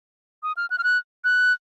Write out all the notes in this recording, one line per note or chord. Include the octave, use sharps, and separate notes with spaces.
D#6
F6
F#6
F6
F#6
F#6